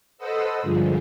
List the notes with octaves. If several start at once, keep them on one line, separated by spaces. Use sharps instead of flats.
A4 B4 C5 D#5 F#5 E6
G2 D3 F3 G#3